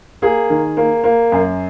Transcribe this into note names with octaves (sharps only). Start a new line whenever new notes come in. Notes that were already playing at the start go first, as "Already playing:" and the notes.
A#3 G#4
D#3
A#3
A#3
F#2